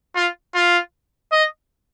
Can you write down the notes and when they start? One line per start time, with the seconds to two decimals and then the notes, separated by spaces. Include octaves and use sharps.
0.15 F4
0.55 F4
1.32 D#5